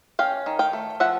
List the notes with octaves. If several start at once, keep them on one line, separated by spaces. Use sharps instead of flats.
C#4 F5 G5
D#3
F5 G5
A3
F3 E5 F#5